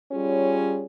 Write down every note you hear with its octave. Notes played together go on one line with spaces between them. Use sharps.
G3 C#4 F4 G#4 C#5